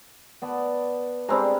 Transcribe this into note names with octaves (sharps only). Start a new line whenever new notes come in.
B3 D5 A5
G3 G#3 C4 D4 A#5